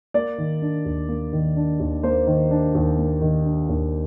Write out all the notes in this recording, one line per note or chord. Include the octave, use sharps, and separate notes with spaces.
A#3 D5
D#3
D4
D#2
A#3
D#3
D4
D#2
A#3 C5
D#3
D4
D#2
A#3
D#3
D4
D#2